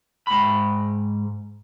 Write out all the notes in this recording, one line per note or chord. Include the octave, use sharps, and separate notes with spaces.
G#2 B5